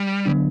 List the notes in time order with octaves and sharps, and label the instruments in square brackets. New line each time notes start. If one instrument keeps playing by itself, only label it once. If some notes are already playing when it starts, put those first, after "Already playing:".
Already playing: [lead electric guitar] G3
[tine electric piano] D3 F#3 B3 D4